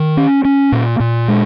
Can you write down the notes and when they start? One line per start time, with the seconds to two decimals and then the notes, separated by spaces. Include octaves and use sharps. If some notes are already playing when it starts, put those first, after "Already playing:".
Already playing: D#3
0.17 C#4
0.45 C#4
0.72 A#2
1.00 A#2
1.28 G#3